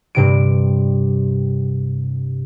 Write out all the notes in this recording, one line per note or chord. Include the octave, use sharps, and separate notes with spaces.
G2 C3 D7